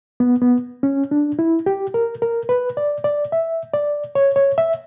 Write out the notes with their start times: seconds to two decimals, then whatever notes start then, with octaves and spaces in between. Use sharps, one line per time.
0.20 B3
0.42 B3
0.83 C#4
1.11 D4
1.39 E4
1.66 G4
1.94 A#4
2.22 A#4
2.49 B4
2.77 D5
3.04 D5
3.32 E5
3.73 D5
4.15 C#5
4.36 C#5
4.58 E5